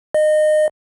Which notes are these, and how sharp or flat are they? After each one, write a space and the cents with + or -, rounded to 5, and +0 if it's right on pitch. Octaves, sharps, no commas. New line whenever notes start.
D#5 -25